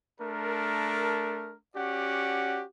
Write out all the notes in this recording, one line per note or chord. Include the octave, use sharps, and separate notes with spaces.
A3 D4 A#4
C#4 F#4 G4 D5 F#5